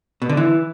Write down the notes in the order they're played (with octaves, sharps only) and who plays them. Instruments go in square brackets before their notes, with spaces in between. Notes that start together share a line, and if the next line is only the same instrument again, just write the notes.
[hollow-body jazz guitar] B2
D3
E3